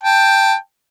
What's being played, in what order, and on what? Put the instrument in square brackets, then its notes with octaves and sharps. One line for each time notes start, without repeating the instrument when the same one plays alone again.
[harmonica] G5 A5